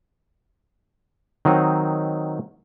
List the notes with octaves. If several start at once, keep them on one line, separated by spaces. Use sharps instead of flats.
D#3 F#3 C4 D#4